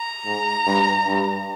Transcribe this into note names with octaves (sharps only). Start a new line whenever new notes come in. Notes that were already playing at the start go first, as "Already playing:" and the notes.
Already playing: A#5
G#2
G2
G2